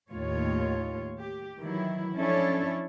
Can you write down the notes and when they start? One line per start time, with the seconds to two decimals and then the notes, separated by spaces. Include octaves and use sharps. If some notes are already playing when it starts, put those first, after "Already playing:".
0.10 D#2 A2 F4 C#5
1.19 G4
1.59 D#3 E3 F#3 E4
2.16 F3 C#4 D4 E4 A4 C#5